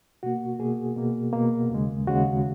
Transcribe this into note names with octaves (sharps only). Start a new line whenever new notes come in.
B2 A#3 F#4
B2 A#3 G#4
B2 A#3
B2 A#3
D#2 C#3 G#3
D#2 C#3 G#3 F#4